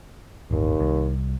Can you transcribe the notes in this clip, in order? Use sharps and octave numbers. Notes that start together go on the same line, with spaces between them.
D1 G1 D#2
C2